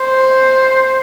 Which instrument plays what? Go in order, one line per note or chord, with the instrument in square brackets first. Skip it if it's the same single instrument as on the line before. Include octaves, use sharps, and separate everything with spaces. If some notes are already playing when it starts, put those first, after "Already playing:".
Already playing: [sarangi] C5